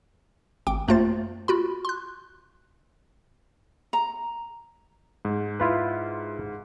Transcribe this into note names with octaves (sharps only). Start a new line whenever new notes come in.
G#1 G5 D6 D7
F#2 A3 A#3 F4 C5 A6
F4 F#4 B5
C6 F#6
A#5
G#2
E4 F4 B4